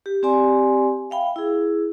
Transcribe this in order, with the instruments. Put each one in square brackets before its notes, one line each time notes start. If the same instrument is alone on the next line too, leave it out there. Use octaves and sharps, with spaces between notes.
[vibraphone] G4
C4 G4 D5 G#5 C6
E5 F5 G5 B5
E4 G#4